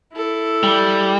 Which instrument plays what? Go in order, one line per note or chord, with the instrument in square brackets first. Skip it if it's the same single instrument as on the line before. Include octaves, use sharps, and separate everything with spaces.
[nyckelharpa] E4 A4
[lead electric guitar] G3